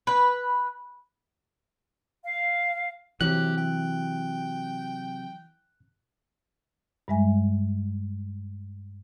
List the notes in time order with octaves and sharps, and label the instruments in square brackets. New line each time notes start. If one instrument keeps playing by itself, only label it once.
[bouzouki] B4
[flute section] F5
[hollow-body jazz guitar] C3 F#3 [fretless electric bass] E3 [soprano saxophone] G4 [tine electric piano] F#6
[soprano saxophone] G5
[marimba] G2 G3 G#3 E5 G#5